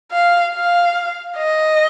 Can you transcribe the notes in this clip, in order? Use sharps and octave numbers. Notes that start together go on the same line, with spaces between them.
F5
F5
D#5